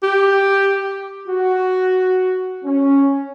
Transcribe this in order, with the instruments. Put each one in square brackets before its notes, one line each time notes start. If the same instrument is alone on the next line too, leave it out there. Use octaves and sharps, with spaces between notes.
[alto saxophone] G4
[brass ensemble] F#4
C#4